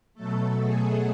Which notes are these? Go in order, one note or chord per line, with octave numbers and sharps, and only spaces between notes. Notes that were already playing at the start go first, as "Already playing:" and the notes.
B2 F#3 A3 A4
G#4